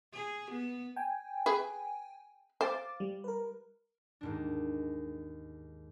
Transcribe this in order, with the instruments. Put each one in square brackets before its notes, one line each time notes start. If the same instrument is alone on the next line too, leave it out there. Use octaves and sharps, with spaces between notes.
[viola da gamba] G#4
B3
[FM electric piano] G5 G#5
[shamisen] G#4 B4
[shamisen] C5 [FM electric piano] F5 D6 A6
[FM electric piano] G3
A#4 B4
[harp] D#2 G#2 D4